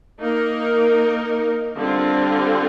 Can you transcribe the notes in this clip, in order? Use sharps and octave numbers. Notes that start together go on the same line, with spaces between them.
A#3 D#4 A#4
D3 G3 C4 F4